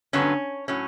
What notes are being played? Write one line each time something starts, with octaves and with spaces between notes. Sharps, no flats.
G2 D3 F#3 B3 C#4
A2 F#3 C#4